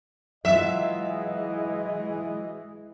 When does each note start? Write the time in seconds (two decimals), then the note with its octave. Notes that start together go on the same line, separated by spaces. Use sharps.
0.45 E3 F#3 G#3 F4 D#5 E5